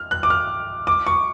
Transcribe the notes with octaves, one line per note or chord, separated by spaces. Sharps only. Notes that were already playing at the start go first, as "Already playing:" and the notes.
Already playing: F6
F#6
D6
F6
D6
C#6